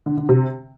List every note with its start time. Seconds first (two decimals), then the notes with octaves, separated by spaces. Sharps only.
0.06 D3
0.17 D3
0.29 C3